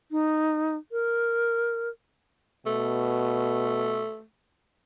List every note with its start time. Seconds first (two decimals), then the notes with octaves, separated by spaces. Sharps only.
0.11 D#4
0.92 A#4
2.66 B2 A3